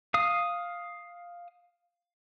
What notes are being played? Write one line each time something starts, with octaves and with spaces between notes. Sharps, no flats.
F5 D#6